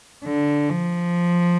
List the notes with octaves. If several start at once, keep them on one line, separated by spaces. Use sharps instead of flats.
D3
F3